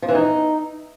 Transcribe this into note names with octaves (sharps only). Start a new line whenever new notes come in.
F3
E3
D#4